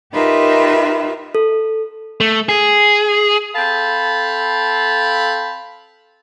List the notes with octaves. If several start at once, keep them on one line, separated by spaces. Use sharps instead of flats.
D#4 F4 G4 A#4 B4 E5
A4
A3
G#4
C4 A4 F5 A5 B5